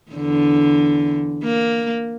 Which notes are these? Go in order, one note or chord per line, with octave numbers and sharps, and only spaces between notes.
E2 D3
A#3